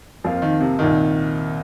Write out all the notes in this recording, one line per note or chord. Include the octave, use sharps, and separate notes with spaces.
F2 F3 A#3 F4
D#3
C3
C2 A#2 D#3 A#3 D#4